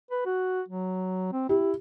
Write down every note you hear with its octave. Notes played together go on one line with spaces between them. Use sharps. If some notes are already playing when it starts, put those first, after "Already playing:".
B4
F#4
F#3
C4
E4 G4